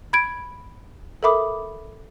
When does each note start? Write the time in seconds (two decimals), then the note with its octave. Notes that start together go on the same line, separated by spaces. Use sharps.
0.13 B5 G#6 D7
1.23 A4 A#4 E5 B5 D6 D#6